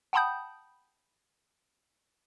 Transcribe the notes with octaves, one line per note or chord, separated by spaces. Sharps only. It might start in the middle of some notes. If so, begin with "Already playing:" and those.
F#5 G5 A5 B5 D#6 G6